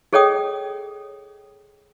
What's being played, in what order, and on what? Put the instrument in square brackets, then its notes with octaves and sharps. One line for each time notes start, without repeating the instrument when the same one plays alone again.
[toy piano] G#4 A4 C#5 D#5 G5 D#6